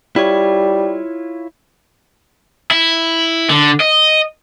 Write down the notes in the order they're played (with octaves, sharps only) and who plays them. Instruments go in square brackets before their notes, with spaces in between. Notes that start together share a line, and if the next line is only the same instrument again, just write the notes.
[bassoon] G3 [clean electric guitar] E4 F4 C#5
[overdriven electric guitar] E4
D3
D#5